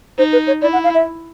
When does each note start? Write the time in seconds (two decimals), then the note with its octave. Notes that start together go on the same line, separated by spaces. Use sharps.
0.18 D#4 C5
0.33 B4
0.47 C#5
0.62 E4 D5
0.73 F#5
0.84 F5
0.94 E5